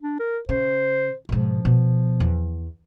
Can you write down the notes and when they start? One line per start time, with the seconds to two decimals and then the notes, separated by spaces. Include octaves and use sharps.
0.01 D4
0.20 A#4
0.49 C#3 C5
1.29 G#2 B2 F3
1.65 B2 B3
2.20 E2